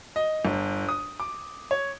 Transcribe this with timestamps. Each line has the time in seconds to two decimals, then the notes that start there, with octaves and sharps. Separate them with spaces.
0.16 D#5
0.45 G1
0.89 D#6
1.20 D6
1.71 C#5